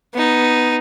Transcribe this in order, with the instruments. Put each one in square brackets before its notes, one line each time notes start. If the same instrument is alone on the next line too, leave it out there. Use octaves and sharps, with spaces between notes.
[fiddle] B3 D#4